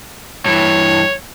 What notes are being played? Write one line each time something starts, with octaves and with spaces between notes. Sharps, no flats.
G2 E3 C#5